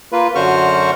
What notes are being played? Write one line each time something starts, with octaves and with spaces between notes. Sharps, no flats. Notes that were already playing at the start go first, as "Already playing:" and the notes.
A#3 F4 B4
F#2 D3 F#4 C5 C#6 F6